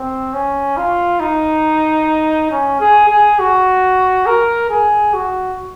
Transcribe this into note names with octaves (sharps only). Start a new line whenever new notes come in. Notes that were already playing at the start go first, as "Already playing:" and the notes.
Already playing: C4
C#4
F4
D#4
C#4
G#4
G#4
F#4
A#4
G#4
F#4